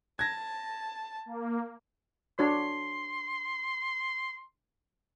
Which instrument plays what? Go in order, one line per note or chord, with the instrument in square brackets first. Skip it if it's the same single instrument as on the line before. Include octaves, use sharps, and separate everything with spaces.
[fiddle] A5 [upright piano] G#6 A#6
[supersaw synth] A#3
[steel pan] D4 F#4 C#5 [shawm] C6